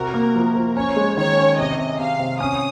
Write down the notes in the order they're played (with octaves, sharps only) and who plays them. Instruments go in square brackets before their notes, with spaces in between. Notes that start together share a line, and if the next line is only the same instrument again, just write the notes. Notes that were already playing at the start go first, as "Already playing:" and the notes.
Already playing: [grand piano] C3 F#4 [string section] A#4
[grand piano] A#3
F3
F3
[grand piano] C#4 [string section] C#5
[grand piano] G#3
[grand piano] D#3 [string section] C#5
[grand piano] C#4
[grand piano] C3 [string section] D#5
[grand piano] C3
[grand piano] C3 [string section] F5
[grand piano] C3
[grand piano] C#4 [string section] D#6